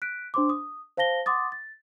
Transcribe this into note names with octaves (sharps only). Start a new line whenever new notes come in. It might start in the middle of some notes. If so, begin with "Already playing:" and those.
F#6 B6 D7
D4 C5 C6 D6
D#6
C5 F5 A5 A#6 G7
F#5 C6 D6 D#6 A6
A6